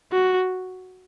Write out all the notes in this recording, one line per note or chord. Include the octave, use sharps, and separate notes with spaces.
F#4